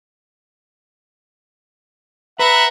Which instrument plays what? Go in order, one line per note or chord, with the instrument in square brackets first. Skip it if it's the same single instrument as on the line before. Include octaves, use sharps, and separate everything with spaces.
[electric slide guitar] B4 [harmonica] E5 F#5 A#5